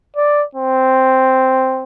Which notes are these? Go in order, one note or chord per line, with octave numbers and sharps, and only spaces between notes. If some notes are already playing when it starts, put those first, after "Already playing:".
D5
C4